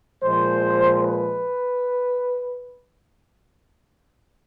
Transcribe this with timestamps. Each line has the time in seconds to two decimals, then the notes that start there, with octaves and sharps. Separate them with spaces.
0.23 A#2 F3 G#3 C5
1.01 B4